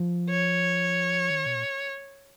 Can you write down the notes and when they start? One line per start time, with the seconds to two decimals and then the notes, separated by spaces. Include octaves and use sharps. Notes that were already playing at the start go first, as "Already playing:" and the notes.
Already playing: F3
0.30 C#5
1.30 D#3
1.46 B2
1.55 A#2